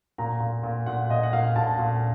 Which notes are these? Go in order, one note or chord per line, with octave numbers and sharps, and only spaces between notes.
A#2 A#5
A#2
A#2
A#2 F#5
A#2 D#5
F#5
A#2 F5
A#2 A5
A#2